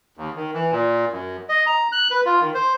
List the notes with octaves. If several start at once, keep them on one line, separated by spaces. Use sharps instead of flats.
D#2
D#3
E3
A#2
F#2
D#5
A#5
F#6
B4
F4
D#3
C5